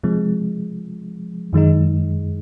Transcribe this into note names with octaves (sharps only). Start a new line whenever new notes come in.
C3 F3 G#3
F#2 D#3 G#3 D#4